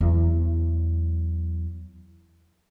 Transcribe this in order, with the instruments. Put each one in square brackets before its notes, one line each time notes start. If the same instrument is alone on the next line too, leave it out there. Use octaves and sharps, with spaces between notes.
[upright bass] E2 F#3